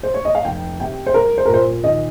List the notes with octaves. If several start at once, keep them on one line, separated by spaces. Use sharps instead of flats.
C5
C#5
D#5
F5
F1 G5
C3 G5
C5
C2 A#4
C5
A#4
A#2 C5
D#3 D#5